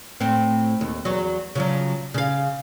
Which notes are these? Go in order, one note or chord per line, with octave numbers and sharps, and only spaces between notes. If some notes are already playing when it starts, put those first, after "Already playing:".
A2 C4
D#2
E2 F#3
C#3 F3 F#3
C#3 F5